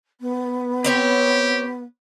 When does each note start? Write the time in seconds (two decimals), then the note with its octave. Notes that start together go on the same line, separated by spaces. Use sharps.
0.20 B3
0.84 C4 G4 C#5 G5